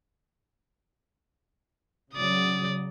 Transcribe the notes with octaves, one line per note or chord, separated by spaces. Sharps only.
C#3 F#3 D5 D#6